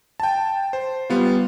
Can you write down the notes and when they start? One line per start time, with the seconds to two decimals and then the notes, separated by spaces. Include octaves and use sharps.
0.20 G5 A5
0.73 C5
1.10 G3 B3 F4